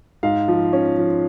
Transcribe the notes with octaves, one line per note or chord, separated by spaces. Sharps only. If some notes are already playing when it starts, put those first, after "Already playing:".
G#2 F5
F3
C#4
F3